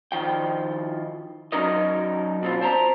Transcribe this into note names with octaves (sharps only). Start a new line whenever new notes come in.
D#3 F3 G5
F#3 C#4 D#4 A#4 D#5
B2 C4 F4
C5 A5 A#5